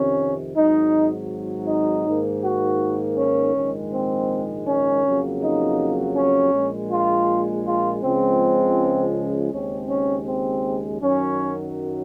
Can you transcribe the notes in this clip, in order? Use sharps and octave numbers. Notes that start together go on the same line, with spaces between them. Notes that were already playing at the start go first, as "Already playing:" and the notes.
Already playing: F2 C3 D#3 C#4
G#1 G#2 F#3 D#4
D#4
G#2 D#3 A#3
F#4
C#4
A#1 G#2 D#3 G#3
C4
C#4
F2 C#3 F#3 A#3
D#4
C#4
A#1 A#2 G#3
F4
F4
C#2 C#3 F3 G#3 C4
D#2 C#3 G#3 C4 C#4
C#4
C4
F#2 D#3 F#3 C#4